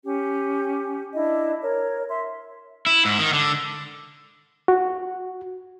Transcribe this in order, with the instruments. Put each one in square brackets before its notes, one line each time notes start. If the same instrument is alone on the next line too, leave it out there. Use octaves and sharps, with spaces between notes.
[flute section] C#4 G4
D4 E4 D#5
A#4 C#5
E5 C6
[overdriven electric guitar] E4
G#2
D#3
D3
[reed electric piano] F#4